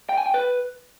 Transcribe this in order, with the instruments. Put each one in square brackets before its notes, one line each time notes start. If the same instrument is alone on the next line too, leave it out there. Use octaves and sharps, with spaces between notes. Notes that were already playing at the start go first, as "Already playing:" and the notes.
[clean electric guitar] G5
G#5
G5
B4